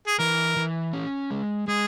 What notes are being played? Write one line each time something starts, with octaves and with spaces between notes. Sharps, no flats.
G#4
E3 A#4
E3
C#4
G#3
G#3 G#4